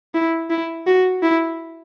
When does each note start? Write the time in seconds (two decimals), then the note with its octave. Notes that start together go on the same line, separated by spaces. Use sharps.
0.14 E4
0.50 E4
0.87 F#4
1.23 E4